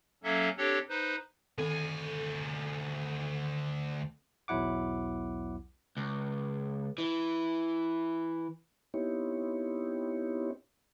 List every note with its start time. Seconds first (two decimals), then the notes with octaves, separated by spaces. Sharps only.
0.23 F#3 A#3 C#4 A4 E5
0.58 C4 D4 G4 A4 C#5
0.89 D#4 B4 C5
1.58 D2 D#3 C4 A4 G#5
4.48 B1 E2 F#3 E4 F#5 D6
5.97 C#2
6.98 E3
8.94 B3 C4 D#4 E4 G4 C#5